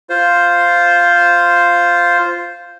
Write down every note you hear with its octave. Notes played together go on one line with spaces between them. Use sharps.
F4 C5